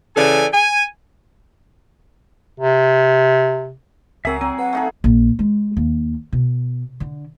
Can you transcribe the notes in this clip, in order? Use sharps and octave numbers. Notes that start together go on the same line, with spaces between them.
C#3 E3 A4 D5 G#5
G#5
C3
C#2 F#3 C4 G#4 A#4 E5 E6
F#3 C4 G#5
B4 F#5
A3 D#4 G#4
A#1
G#3
D#2
B2
D3